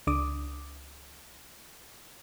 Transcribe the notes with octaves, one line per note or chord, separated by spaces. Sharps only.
C#2 D4 D6 D#6